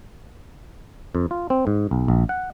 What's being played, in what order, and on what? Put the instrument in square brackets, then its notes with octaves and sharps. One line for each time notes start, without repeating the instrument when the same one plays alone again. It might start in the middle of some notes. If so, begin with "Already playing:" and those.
[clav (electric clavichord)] F2
F4
C4
G#2
B1
A#1
F#5